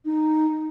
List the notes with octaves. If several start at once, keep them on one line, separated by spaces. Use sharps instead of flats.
D#4